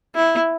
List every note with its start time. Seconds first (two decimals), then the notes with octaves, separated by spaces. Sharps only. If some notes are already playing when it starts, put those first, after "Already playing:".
0.15 E4